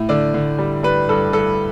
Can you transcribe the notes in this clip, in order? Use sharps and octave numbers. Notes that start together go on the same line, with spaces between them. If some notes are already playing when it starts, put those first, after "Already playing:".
Already playing: A2
D3 D5
D3
G3
G3 B4
G2 A4
G2 A4